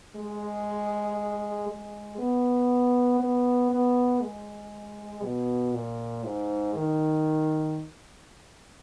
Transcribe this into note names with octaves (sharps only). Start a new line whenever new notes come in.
G#3
G#3
B3
B3
B3
G#3
B2
A#2
G#2
D#3